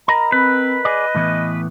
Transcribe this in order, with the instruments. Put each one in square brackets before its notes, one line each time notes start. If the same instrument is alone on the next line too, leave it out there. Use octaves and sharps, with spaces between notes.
[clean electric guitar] A#4 D#5 B5 [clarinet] A#5
[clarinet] C4 [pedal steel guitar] B4
[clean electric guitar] G#4 D5 [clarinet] D#5
[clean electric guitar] A2 E3 B3